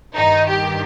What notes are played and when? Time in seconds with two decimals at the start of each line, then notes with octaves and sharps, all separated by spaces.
0.15 G2 D#3 D#4
0.48 G4